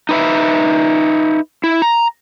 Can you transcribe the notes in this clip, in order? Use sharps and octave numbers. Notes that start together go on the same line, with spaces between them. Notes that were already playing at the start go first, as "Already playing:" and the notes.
D#4 B4 E5
E4
A#5